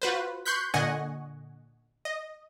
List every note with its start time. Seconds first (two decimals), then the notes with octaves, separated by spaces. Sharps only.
0.02 F4 F#4 B4 C5
0.45 C6 C#6 F#6 G6 B6
0.74 A#2 D3 D#5 F#5 G#5 C#6
2.05 D#5